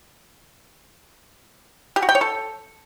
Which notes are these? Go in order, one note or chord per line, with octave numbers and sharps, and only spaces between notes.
G4
F#4
G5
C#5
A4